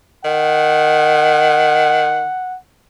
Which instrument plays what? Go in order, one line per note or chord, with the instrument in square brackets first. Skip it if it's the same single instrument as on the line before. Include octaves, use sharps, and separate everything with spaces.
[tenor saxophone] D#3 [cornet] F#5